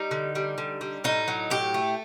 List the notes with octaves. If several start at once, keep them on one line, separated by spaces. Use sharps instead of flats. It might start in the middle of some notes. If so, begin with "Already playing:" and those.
Already playing: G3 D#4
D3
G3
D3
G3
A2 D#4
F#3
A2 G4
A3